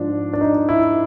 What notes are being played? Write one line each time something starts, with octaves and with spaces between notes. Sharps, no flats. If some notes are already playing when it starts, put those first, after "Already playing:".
Already playing: G#2 F3 D4
D4
D#4
E4